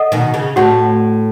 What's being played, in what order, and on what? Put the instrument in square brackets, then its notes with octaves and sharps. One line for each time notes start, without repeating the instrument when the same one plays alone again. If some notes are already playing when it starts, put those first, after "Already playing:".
Already playing: [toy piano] A4 D#5 F#5
[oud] B2 D#3
C#3
[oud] A2 [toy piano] F#4 C#5 F#5 C#6